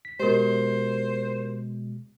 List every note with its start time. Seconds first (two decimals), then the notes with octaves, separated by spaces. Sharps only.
0.05 B6
0.20 B2 G#3 G4 A#4 C5